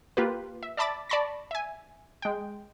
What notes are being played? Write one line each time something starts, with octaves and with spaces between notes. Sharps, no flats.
A#3 F4 G4 B4
E5
D5 E5 A5 B5 D6 A6
D5 A5 B5 C#6 A#6
E5 G#5
G#3 G5